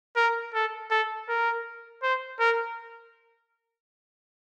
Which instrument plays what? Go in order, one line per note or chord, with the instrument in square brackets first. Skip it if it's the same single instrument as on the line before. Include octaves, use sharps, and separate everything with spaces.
[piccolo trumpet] A#4
A4
A4
A#4
C5
A#4